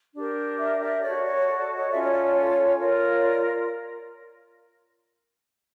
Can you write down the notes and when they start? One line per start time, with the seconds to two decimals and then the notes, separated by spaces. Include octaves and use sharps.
0.14 D4 G4 A#4
0.58 D5 E5
0.80 D5 E5
1.02 F#4 A4 C#5 D5
1.24 C#5
1.46 D5
1.75 C#5 D#5
1.89 C#4 F4 A4 D5 E5
2.01 C#5 D#5
2.12 D5
2.23 C#5
2.78 F4 A#4 C#5
3.22 D5